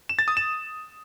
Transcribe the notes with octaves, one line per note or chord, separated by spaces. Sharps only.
E7
A6
D#6
E7